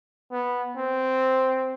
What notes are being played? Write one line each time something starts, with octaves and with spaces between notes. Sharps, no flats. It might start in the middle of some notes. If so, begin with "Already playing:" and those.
B3
C4